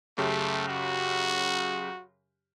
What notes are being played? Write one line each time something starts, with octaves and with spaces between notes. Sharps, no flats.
F#2 C#3 A3 G4
F#4